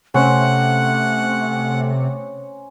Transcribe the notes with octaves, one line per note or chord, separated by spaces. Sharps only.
C3 A3 C#4 C5 F#5